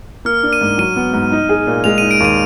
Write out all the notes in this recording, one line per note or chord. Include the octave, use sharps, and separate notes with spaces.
A#3 F6
D4
D#7
G#2
F#3 D#7
B3
G#2
D#4
G#4
A#2
G#3 F7
D#4 D#7
D7
D#2 D#7